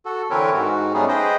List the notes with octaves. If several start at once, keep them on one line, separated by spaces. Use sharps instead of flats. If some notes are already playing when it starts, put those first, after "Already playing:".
F#4 A4
D3 E3 C4 A#4 B4 C#5
G#2 F#4
G3 A3 B3 C#4 D#4 G#4
G#4 B4 C5 D#5 G5